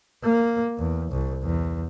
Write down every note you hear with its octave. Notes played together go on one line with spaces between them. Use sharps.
A#3
E2
C2
E2